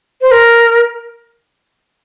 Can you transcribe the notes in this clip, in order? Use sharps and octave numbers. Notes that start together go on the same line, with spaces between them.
C5
A#4